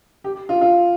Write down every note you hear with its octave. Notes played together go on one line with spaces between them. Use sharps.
G4
F4
F4